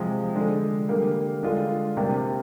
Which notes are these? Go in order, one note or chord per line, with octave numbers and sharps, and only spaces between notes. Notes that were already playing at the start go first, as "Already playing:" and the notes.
Already playing: C3 F3 G#3
D3 G#3 D4
D3 G3 A#3
D3 G#3 D4 F4
C3 G3 A#3 D4